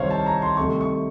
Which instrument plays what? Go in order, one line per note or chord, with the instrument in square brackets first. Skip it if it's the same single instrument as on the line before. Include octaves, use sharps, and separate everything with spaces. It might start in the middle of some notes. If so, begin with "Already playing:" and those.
Already playing: [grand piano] C2 C3 D#3 C5 C#5 F5
A5
A#5
C6
C2 C3 D#3 A3 C#6
C#6